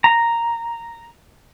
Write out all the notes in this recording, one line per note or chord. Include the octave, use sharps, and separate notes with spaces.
A#5